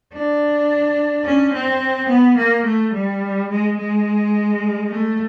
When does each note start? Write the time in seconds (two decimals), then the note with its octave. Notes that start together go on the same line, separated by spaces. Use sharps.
0.13 D4
1.25 C#4
1.53 C4
2.09 B3
2.37 A#3
2.65 A3
2.94 G3
3.50 G#3
3.77 G#3
4.89 A3